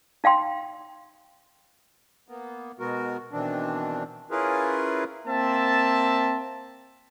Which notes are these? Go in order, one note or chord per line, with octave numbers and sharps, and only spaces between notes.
D#4 F5 G5 C6
A#3 B3
B2 G#3 B3 F#4 A#4
B2 D#3 E3 C4 D4
C#4 E4 F4 G#4 A#4 B4
A#3 C4 E5 A5